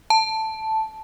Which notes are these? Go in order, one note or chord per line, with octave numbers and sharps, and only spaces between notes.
A5